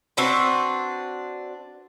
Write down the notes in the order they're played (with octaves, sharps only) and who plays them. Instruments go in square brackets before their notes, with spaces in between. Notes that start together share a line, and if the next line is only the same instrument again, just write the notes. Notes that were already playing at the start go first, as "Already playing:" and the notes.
[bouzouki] C4 D4 F#4 B4